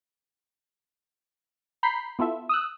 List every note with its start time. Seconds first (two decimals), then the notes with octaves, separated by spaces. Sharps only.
1.83 A#5 B5 G6 B6 C7
2.19 B3 E4 F4 A4 E5
2.49 D#6 E6 F#6